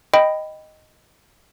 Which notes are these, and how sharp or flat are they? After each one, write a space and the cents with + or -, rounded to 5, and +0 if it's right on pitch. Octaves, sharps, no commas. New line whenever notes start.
D#5 +0 G5 +0 B5 +10